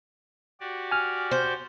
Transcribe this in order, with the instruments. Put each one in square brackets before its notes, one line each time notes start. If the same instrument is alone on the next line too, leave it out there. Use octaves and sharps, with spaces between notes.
[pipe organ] F#4 G4 D5
[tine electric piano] G#5 F6
[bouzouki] C5